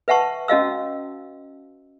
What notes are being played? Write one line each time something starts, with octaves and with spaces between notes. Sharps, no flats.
B4 E5 F#5 A5 C#6
C#4 F#4 D#5 F5 E6